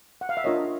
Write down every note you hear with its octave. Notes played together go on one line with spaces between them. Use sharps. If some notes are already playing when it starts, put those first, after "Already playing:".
F#5
F5
E5
D4 F4 A#4 C#5 D#5